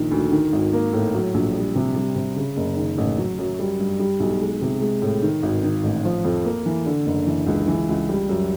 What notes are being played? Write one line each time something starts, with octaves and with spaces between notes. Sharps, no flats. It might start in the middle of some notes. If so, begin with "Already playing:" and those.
Already playing: A#1 D#3
D2
D#3
G#1
A#3
A2
F#3
A#1
G3
C3
G3
C3
C#3
F#1
D#3
A1
F#3
F#2
G3
G2
G3
B1
G#3
C3
G#3
A2
D#3
G#1
D#3
A1
F3
F2
A#3
E3
D3
F#1
E3
C#2
E3
C#2
G3
F#2